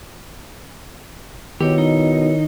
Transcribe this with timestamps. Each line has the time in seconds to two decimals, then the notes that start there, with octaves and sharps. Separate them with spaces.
1.60 B2 D#3 E4 G4 A#4 C#5
1.78 D#4